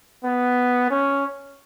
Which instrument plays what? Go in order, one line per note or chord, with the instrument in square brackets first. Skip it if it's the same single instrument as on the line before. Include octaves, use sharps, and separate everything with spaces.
[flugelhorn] B3
C#4